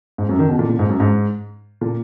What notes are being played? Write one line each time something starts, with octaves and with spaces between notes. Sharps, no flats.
G#2
F#2
D#3
B2
A#2
A#2
G#2
F#2
G#2
A#2